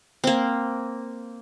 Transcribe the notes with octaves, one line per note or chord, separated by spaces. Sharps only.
A#3 C4